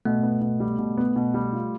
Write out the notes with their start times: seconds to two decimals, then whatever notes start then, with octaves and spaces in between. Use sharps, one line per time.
0.05 B2 A3
0.23 B3
0.42 B2
0.60 G3
0.79 B2
0.97 B3
1.16 B2
1.34 G3
1.53 F4